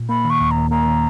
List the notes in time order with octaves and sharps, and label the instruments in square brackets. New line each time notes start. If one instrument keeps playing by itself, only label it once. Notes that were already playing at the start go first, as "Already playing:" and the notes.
Already playing: [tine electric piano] A#2
[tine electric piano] A#3 [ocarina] B5
[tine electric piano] D#3
[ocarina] C#6
[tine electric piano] D#2
[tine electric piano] D#2 [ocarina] A#5
[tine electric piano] A#3 [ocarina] A#5
[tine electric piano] D#3